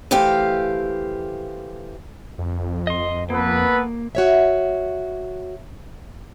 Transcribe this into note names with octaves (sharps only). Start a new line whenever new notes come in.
E3 A3 G4 C5 F5
F2
D#5 C6
A#3 B3 A4 B4
F#4 C#5 E5